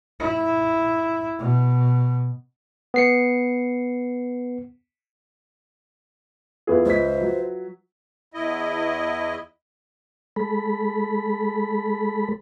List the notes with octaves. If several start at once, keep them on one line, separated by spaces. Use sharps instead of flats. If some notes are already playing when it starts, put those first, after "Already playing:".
E4
B2
B3 C7 C#7
E2 F4 G#4 B4 E5
C#2 C5 B6
F#3
E2 E4 D#5
G#3 A4 B5